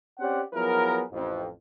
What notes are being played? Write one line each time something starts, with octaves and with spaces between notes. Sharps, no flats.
C4 C#4 G4 C5 D5 F#5
F3 F#3 B3 E4 G#4 A#4
A1 F2